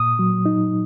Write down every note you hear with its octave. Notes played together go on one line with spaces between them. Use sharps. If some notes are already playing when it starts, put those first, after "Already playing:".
Already playing: A#2 D#6
F#3
D#4